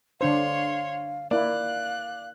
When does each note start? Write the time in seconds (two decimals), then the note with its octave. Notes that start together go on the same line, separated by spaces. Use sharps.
0.21 D3 D4 C5 C#5 F5 C6
1.31 A#3 E4 D5 F5 F#6